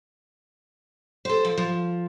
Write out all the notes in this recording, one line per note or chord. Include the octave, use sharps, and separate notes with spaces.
A4 C5
F3
F3